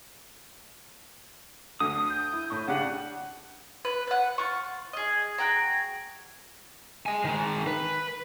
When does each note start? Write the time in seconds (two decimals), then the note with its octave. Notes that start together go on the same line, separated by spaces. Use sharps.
1.80 D2 D3 D#6
2.10 G6
2.32 E4
2.50 A2 C#6
2.68 C#3 D4 G4 F#5
3.85 B4
4.07 B4 F#5
4.38 F4 C#6
4.93 G#4 D#5
5.38 F#4 G#4 G5 A#5
7.06 D#5 G#5
7.25 D#3 G#3
7.67 B4